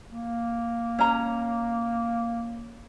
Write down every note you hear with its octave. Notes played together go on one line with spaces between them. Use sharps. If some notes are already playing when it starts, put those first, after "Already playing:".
A#3
C#4 A#5